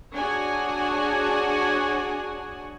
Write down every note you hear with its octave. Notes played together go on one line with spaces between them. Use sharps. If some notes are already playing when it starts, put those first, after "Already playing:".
D4 F#4 G#4 C#5 F#5 G#5